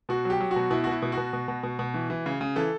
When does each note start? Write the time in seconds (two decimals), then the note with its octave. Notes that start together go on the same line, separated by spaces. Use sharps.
0.09 B2 F#4
0.25 F#3 G4
0.41 F#3
0.51 F#4
0.56 B2
0.70 B2 E4
0.84 F#4
0.87 B2 E4
1.02 B2
1.12 F#4
1.17 B2
1.33 B2
1.48 B2
1.63 B2
1.79 B2
1.94 E3
2.10 E3
2.26 C#3
2.41 C#3
2.56 E3 A4